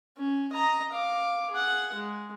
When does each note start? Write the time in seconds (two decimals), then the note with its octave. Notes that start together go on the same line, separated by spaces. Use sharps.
0.17 C#4
0.52 D#5 A#5
0.93 F5 D6
1.50 G#4 F#5
1.94 G#3